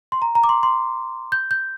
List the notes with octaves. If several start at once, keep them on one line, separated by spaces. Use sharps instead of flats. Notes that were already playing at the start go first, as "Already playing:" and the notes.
C6
A#5
A#5
D6
C6
C6
G6
G6